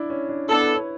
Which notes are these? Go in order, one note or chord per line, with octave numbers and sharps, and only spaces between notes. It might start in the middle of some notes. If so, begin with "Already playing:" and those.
Already playing: D4 E4
C#4
D4
B3 D4 E4 A4
B4
C#5